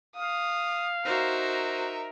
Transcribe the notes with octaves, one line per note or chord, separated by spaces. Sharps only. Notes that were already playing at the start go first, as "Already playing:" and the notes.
F5 D#6
D#4 F#4 A#4 C5 E5